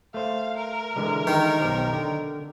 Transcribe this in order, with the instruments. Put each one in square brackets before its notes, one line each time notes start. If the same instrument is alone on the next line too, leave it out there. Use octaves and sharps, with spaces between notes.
[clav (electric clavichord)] A3 C5 [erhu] F5
[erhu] A#4
[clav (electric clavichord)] D3 E3 G#3
[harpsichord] D#3
[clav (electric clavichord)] B1 G4 C5
D3